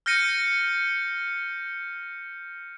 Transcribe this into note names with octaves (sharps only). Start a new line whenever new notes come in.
F6 G6 A#6 C#7 D#7